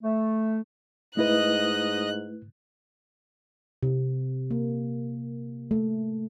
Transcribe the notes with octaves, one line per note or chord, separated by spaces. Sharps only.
A3
G#2 A3 E4 B4 D#5 F#6
C3
A#3
A3